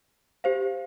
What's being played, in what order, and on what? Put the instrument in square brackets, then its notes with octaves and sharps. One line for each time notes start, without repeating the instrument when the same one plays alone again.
[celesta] G4 C5 F5